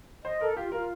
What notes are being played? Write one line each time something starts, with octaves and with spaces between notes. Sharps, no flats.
C5 D#5
A4 A#4
F4 G4
F4 A#4